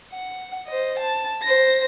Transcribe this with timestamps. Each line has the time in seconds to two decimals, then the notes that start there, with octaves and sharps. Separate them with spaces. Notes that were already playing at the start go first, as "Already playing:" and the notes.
0.12 F#5
0.68 C5 D#5
0.99 A5
1.43 C5 A#6